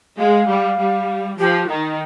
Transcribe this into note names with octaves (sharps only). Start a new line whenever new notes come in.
G#3 F5
G3
G3
F3 G4
D#3 D#4